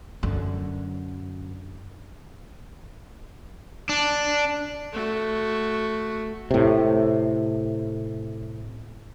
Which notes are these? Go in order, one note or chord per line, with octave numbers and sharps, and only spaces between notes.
F#2 D3
D4
A3 F#4
A2 C3